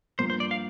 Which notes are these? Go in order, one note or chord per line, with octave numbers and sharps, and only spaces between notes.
G2 F3 A#3 C5
C5
D5
F5